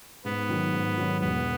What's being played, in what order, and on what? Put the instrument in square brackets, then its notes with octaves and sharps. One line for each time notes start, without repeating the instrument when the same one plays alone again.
[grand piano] G#2 [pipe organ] B3
[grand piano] D#3 F#3
G#2
D#3 F#3
[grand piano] E1 [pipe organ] B3